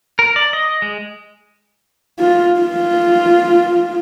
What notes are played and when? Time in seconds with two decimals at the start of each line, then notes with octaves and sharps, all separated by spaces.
0.19 A#4
0.36 D5
0.53 D#5
0.82 G#3
2.19 F4
2.61 F4